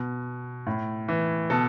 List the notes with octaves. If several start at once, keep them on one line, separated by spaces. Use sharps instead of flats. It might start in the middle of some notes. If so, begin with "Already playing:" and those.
Already playing: B2
A2
E3
B2 A4